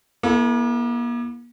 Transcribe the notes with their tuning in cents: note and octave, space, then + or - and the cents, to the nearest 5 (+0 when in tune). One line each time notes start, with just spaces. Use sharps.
A#3 +45 E4 +0 A4 -15